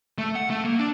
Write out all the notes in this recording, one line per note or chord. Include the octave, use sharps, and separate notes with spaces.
A3
F#5
A3
A#3
D4